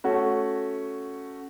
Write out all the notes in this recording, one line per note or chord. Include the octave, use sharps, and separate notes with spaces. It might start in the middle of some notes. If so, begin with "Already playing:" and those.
A3 C#4 F#4